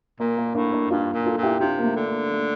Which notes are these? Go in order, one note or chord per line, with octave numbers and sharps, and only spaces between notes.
A#2 A#3
A#3
A2 A#3 D4
A#3 D4
G2 D4 F4
A#2
F4 A4
A#2
E4 G4
C3 D4 F4
A#3
A3
D3
A#3
A3